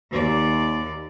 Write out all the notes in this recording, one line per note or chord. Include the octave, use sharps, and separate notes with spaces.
D#2 D5